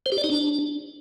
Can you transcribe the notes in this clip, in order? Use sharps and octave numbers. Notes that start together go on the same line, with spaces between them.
C5
G4
D5
D#4
D4